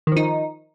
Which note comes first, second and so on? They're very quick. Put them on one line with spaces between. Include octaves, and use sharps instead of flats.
D#3 F3 D#4